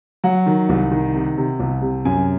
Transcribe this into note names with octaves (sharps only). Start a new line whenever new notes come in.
F#3 F#5
D#3
C2
D#3
C3
C3
C2
C3
F#2 G#5